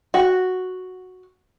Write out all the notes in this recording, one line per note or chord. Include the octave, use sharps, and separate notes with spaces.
F#4